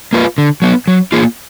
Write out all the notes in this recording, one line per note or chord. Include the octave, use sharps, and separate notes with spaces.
A#3 F4 B4
D3
F#3 B3
F#3
A#3 F4 G#4